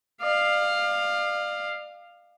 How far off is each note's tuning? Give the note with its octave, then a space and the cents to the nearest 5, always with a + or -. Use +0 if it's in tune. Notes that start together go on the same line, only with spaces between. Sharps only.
D5 +40 F5 +0